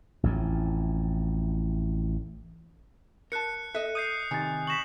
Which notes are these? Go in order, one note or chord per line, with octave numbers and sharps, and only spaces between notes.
A1 F2 A2
A#4 A5 F#6 C#7
A4 D#5 E5 F#6
D#6 G6 C7 D#7
C3 D#3 D#4 G#5 A6
C#6 A#6 B6 E7 F#7